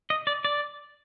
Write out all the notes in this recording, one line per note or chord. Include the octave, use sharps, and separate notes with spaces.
D#5
D5
D5